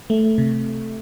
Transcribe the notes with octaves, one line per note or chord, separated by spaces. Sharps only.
A3
C3